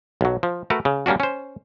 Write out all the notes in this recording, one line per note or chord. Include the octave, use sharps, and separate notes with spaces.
B1 F#3
F3
A3 F#4 A#4 B4
C#3
G3 A#3 C#4 D4 F#4
C#4 C5